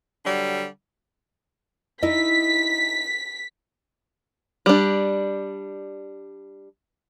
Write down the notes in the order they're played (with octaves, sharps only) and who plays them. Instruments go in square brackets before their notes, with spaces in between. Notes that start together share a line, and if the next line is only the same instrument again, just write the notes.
[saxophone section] D3 F#3 G3
[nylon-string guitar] D#4 E4 D#5 [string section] B6
[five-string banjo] G3 D4